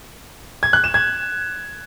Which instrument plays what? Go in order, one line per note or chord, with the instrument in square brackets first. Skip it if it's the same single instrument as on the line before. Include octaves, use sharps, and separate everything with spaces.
[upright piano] G#6
F#6
E7
G#6